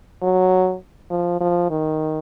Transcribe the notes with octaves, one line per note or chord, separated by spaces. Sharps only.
F#3
F3
F3
D#3